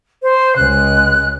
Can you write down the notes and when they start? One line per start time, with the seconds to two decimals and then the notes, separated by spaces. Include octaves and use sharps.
0.23 C5
0.56 C#2 G#3 F#6